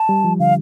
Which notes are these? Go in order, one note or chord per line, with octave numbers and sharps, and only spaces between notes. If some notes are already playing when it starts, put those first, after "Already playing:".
Already playing: A5
G3
F3
D3 F5